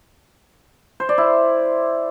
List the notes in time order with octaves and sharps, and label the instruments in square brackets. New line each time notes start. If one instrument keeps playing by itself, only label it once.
[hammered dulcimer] C5
D5
E4